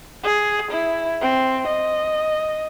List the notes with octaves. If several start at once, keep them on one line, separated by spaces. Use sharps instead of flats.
G#4
E4
C4
D#5